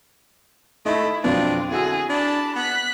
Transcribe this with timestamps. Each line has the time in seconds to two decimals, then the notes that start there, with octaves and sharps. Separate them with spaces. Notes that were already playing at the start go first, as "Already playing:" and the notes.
0.86 A3 D#4 E4 D#5 E5
1.24 F2 B2 F#3 C4 D4 F4
1.71 D3 E4 F#4 G#4 E6
2.10 D4 A5 B5
2.56 B3 F#6 B6